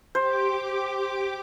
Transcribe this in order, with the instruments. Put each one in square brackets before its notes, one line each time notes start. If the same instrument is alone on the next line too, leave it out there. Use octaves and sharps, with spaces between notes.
[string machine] G4 D6 [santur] C5